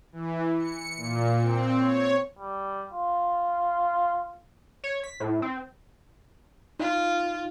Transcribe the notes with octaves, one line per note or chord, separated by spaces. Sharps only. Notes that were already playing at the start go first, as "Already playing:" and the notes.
E3
C#7
A#2
C4
C#5
G3
F4
C#5
B6
A2
C4
D#4 F4